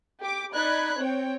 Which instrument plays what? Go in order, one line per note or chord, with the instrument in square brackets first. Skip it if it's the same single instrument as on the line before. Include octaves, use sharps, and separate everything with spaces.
[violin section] G4 D6
D#4 D5 B5 F#6 G#6
C4 C#5 G5